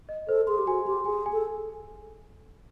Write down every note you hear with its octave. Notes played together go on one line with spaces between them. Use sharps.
D#5
A4 C5
G#4 C6
G4
F#4 G#5
G4 C6
G#4 G#5
G#5
A4